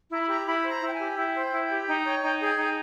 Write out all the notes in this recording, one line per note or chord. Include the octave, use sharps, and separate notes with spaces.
E4 A#5
B5
G4 A#5
E4 B5
C5
A#5
E4
G5
G#5
G4
E4 G5
C5
E4
G4
D#4
C#5
D#4
G#4
D#4